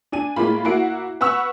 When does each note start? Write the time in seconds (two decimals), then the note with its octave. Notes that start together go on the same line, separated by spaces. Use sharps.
0.12 D4 G#5 D#7
0.36 A2 G#3 A#3 F4 B5
0.65 A#3 E4 F#4 F#5 C7 D7
1.21 B4 F#5 C#6 E6 F6